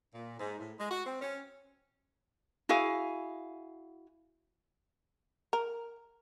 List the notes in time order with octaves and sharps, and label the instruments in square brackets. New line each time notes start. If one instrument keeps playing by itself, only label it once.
[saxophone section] A#2
G#2
A2
G#3
F#4
C4
C#4
[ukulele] E4 F#4 G#4 F5
[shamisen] A#4